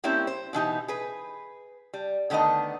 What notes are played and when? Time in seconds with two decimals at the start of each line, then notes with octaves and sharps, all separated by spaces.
0.04 G3 A#3 C4 C#4 E4 G4
0.27 C5
0.53 B2 E3 D#4 G4
0.88 G#4 B4
1.93 G3
2.30 D3 D#3 A3 B3 D#5